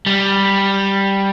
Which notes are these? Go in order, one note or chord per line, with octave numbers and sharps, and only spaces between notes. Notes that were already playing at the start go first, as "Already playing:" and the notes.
G3